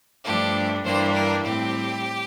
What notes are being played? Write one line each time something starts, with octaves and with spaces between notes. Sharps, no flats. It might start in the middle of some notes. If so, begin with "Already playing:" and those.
G2 F3 A3 D4 G4
G2 E3 G3 A#3 D4 C5
A#4
A2 G3 C4 G4